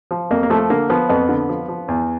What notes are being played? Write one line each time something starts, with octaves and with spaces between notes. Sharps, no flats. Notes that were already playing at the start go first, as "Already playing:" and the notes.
F3
F2 A#3
A#3
F3 A3
D3 A#3
F3 B3
F2 B3
D3
F3
F3
E2